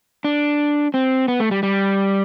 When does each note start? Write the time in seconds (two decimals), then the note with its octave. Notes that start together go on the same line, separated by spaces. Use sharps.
0.24 D4
0.94 C4
1.28 B3
1.40 A3
1.51 G3
1.63 G3